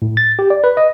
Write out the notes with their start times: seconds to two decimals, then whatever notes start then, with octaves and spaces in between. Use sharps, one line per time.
0.02 A2
0.17 A6
0.39 G4
0.50 D5
0.64 B4
0.77 D#5